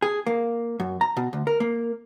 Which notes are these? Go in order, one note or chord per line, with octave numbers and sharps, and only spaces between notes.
G#4
A#3
F#2
A#5
B2
D2
A#4
A#3